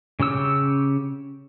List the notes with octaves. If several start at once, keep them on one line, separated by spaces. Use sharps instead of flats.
C#3 C#4 G4 E6